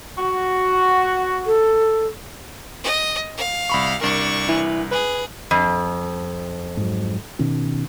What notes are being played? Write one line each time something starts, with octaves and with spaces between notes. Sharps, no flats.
F#4
A4
D#5
F5
C2 B5 C#6
C2 D4 A#4 C#6
E3
G#4 B4
F2
G#2 F#3
B2 D#3 C#4